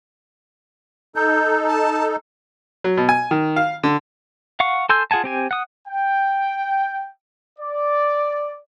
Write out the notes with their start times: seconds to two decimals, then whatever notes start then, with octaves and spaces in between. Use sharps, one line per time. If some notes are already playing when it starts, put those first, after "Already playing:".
1.16 D#4 A4 G6
1.68 A5
2.84 F#3
2.97 B2
3.09 G#5
3.31 D#3
3.56 F5
3.83 D3
4.60 F5 F#5 C#6
4.89 A4 G#5 C6 E6 G6
5.11 F4 G#4 F#5 G#5 A5
5.24 C4 G4 G#5
5.51 F#5 D#6
5.88 G5
7.59 D5